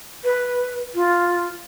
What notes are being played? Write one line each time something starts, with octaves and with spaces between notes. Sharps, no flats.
B4
F4